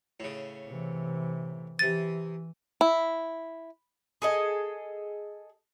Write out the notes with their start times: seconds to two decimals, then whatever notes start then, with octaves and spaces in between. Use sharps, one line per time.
0.20 A2 C#3
0.68 C3 E3
1.79 C3 E3 D#6 A6
2.81 E4
4.22 G#4 A4 D#5